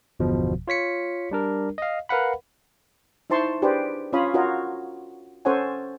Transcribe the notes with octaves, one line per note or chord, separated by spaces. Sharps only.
G1 E2 B2 F3
F4 C#5 B6 C#7
G3 D4 A#4
D#5 F5
A#4 B4 F5 F#5 B5
D#4 E4 C5 A5 C6 C#6
D4 G4 G#4 B4 C5 D5
C#4 F4 C#5 F5 B5 D#6
F4 F#4 A#4 C#5 D#5
C#4 A4 C5 C#5 F#5 G#5